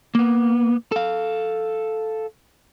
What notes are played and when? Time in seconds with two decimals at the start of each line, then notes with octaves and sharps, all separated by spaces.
0.15 A#3 B3
0.92 A4 F5